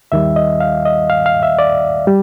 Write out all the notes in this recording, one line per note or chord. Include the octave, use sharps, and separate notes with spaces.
D#2 D#3 G3 E5
D#5
F5
D#5
F5
F5
E5
D5
G3